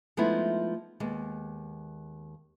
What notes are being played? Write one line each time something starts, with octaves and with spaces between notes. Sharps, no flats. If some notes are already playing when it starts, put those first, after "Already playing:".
F3 G#3 A3 B3 D#4 E4
D#2 G#3 B3